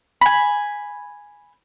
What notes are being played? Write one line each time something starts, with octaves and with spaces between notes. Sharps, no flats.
G#5 B5